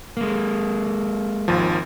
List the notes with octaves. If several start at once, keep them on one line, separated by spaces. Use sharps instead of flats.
G#3 A#3
G#1 D#2 F3